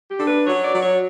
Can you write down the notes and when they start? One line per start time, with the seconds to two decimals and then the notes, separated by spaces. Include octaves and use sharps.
0.09 G4
0.18 D4 A4
0.27 B4
0.47 F#3 C#5
0.64 D5
0.74 F#3
0.83 C#5